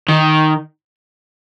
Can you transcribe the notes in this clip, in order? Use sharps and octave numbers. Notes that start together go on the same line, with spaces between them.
D#3